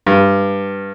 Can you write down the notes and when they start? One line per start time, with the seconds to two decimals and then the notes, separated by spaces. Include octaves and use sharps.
0.06 G2